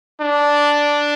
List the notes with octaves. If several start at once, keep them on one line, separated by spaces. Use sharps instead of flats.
D4